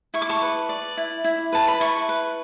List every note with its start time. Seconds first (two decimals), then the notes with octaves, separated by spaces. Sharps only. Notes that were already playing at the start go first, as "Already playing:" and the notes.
0.14 E4 C#6
0.22 D6
0.29 A5 C#6
0.42 B4
0.69 D5
0.97 E4
1.24 E4
1.52 B4 A5
1.68 B5
1.80 E4 A5 C#6
2.09 B4